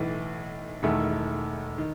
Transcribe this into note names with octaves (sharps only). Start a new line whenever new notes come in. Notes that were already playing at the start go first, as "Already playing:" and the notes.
Already playing: B1 A2 E3
E1 E2 D#3 A3
D#3